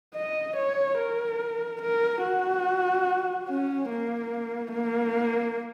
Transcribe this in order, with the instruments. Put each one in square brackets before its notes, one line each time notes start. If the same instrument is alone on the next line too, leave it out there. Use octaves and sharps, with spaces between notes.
[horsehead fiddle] D#5
C#5
A#4
A#4
F#4
C#4
A#3
A#3